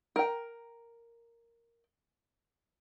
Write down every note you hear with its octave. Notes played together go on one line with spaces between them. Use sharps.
A#4 G5